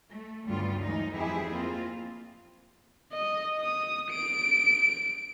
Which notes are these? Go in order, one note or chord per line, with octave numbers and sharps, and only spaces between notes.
A3
D2 G2 C#3 G3 B3 F4
E3 F#3 G#3 D#4
F2 E4 G4 G#4
A#3 C4 F4
D#5
D#6
D7